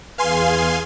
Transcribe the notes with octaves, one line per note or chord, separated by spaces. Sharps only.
E2 G#4 B4 F5 G#5 C6